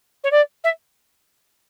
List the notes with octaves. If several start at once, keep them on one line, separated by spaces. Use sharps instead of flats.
C#5
D5
E5